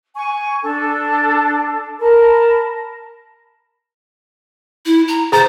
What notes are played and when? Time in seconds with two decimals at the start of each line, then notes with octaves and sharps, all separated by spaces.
0.14 G#5 C#6
0.62 D4 A4 A5
2.00 A#4 A5 B5
4.85 E4
5.08 A#5
5.32 G#4 C5 A#5 A6